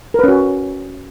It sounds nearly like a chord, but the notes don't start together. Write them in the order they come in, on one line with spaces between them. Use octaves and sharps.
A#4 B4 C#4 F#4